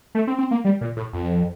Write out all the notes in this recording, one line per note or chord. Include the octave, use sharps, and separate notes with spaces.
A3
C4
C4
A#3
G3
A#2
A2
F2